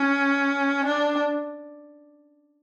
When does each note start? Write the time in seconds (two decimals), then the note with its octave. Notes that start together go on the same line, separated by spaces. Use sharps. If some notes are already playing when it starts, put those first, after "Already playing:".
Already playing: C#4
0.85 D4